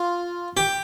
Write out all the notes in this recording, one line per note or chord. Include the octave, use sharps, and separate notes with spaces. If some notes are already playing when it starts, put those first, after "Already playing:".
Already playing: F4
G4